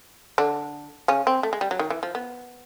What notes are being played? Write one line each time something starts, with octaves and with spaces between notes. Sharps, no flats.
D3 D4
C#3 C#4
C4
A3
G#3
G3
F#3
D#3
E3
F3
B3